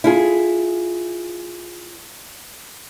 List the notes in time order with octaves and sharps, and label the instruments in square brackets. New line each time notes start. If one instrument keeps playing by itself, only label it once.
[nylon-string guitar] E4 F4 G#4